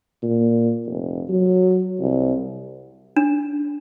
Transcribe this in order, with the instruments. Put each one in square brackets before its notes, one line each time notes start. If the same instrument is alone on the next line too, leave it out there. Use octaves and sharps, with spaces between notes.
[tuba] A#2
F1
F#3
C2
[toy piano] D4